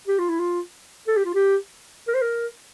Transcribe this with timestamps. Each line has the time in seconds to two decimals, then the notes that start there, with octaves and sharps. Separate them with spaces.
0.08 G4
0.19 F4
0.29 E4
0.40 F4
1.08 A4
1.17 G4
1.25 F4
1.34 G4
2.08 A#4
2.14 C5
2.21 A#4